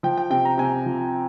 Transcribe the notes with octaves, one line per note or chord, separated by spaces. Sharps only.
F3 G5
G5
C3 G5
A#5
C3 G#5
F3